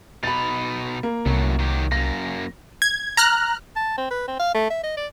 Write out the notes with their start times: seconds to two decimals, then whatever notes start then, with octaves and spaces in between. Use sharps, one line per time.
0.23 B2 D#4 B5 A6
1.03 A#3
1.26 C2 F#2 A2 F#3
1.60 D#3 F#3 G4
1.92 F#2 A#3 A#6
2.82 G#6
3.17 A#5 F6 F#6
3.76 A5
3.97 C4
4.11 B4
4.28 C4
4.40 F5
4.54 A3
4.70 E5
4.83 D#5
4.97 D5